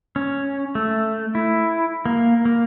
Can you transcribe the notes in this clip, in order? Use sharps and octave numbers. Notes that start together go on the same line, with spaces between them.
C#4
A3
E4
A#3
A#3